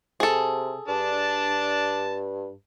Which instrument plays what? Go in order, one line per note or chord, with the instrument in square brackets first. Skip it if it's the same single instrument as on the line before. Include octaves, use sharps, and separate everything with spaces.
[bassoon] C3 [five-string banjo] G#4 A4
[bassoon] G2 [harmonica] D4 A5